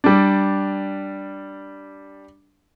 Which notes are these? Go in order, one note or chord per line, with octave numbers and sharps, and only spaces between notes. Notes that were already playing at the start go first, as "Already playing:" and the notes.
G3 D4